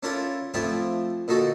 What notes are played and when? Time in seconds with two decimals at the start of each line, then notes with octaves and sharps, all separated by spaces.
0.03 C#4 D4 E4 F4 A4 A#4
0.54 F3 A3 C4 D4 E4 F4
1.28 A#2 D3 D#4 F#4 A4